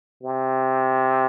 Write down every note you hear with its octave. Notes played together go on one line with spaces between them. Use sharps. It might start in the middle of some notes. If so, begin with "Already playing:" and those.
C3